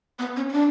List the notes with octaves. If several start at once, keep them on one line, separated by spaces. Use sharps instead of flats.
B3
C#4
C#4
D4